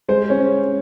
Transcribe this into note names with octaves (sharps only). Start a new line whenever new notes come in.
G#3 C5
C#4